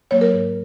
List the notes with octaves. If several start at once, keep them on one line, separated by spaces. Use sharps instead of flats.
F#3 A#3 C#5
A#4
G#2